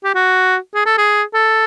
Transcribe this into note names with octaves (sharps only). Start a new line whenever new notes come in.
G4
F#4
G#4
A4
G#4
A4